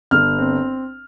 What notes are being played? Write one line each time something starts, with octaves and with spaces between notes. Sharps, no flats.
G1 F6
C4